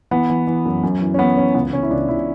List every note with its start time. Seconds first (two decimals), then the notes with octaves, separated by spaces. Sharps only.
0.11 E3 B3
0.30 E3
0.47 E3
0.65 F#2
0.83 F#2
1.00 E3
1.14 C#4
1.19 E3 B3
1.37 E3 C#4
1.55 C#2 B3
1.73 C#2 C#4
1.83 E4
1.90 C#2 D4
2.09 C#2 E4